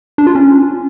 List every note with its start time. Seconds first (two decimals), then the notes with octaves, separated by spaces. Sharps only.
0.18 D4
0.27 F4
0.35 C#4